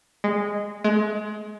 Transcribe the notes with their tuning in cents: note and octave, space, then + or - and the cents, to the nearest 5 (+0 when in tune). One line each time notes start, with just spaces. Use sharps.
G#3 -10
G#3 +25